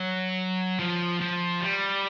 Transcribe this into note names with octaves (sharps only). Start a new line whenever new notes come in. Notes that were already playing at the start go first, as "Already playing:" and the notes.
Already playing: F#3
F3
F3
G3